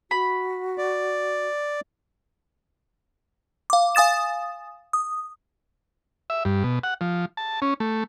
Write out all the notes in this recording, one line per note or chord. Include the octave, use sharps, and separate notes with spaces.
F#4 B5
D5
F5 D6
F5 G#5 D#6 A6 E7
D#6
E5
G2
B2
F#5
F3
A5
C#4
A3